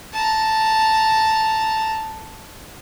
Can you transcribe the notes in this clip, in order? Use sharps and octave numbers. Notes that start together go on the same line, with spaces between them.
A5 A#5